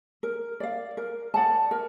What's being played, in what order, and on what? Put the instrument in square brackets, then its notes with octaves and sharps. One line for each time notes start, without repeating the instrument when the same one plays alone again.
[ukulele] A#4
D5 F5
A#4
D5 F#5 A5
A#4